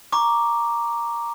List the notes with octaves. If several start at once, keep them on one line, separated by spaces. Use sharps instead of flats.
A#5 C#6 D6